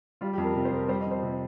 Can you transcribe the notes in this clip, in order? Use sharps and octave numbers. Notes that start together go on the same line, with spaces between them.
G3 F4
G4
F2
A#4
C3 A#4
C5
F2 A#4
G3 C5
D#5
F2
C5
C3